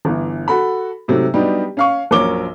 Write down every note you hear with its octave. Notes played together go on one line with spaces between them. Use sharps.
G1 E3
F#4 A4 B5
G#2 C3 F#3 A3
F#3 G3 B3 D4 D#4 G4
C#4 F5 C#6
A#1 F#2 A#4 C#5 D6 G7